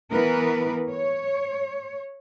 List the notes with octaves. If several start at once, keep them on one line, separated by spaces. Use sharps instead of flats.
E3 B3 A#4 B4
C#5